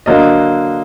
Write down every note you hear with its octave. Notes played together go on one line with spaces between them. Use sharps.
D3 F#3 A#3 D#5